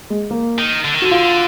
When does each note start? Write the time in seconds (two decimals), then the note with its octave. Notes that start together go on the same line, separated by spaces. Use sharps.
0.10 G#3
0.31 A#3
0.58 D#3
0.85 D3
0.94 D#3
1.02 D3 F#4
1.11 F4